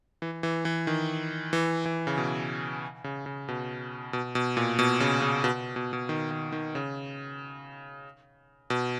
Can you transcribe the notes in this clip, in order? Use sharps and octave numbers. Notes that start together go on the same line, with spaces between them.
E3
E3
E3
D#3
E3
E3
C#3
B2
C#3
C#3
B2
B2
B2
A#2
B2
C#3
C#3
B2
B2
B2
D#3
D#3
D#3
C#3
B2